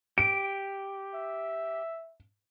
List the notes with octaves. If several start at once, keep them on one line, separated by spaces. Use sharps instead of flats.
G4 D7
E5